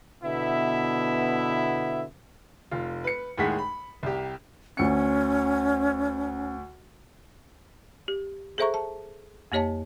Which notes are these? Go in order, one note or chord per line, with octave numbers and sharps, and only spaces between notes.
B2 D3 B3 E4 E5
F1 F4
B4 C#7
D#2 A2 G#3 G#4 F#5 B6
B5
C2 G4
D2 C#4 C#7
G4
G#4 A4 C5 E5 A#5 C#6
A5
F2 A#3 G4 C#5 D#5 A5